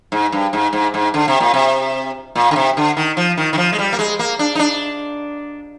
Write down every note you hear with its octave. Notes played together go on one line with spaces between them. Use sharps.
G#2
G2
G#2
G#2
G#2
D3
C3
A#2
C3
A#2
D3
C3
D3
D#3
F3
D#3
D#3
F3
G#3
G3
A#3
G#3
A#3
D4
D#4
D4